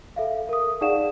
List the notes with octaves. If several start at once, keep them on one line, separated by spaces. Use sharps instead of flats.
A4 E5 F5
A#4 D#6
D#4 G#4 D5 F5 F#5 E7